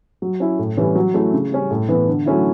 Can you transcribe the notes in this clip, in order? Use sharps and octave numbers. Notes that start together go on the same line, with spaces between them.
F#3
C#4 E4
A2
E3 G3 C#4 E4
F#3
A3 C#4 E4
C#3
G3 C#4
A2
E3 B3
D3
F#3 A3 C#4 E4